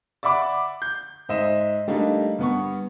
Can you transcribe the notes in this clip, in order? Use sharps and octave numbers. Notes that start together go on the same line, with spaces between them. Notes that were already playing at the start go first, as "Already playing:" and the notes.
D5 E5 F#5 B5 D6
G6
G#2 C5 D#5 E5 E7
G3 A3 A#3 D4 D#4
G2 B3 C#6